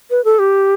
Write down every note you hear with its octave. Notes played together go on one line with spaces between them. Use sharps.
B4
A4
G4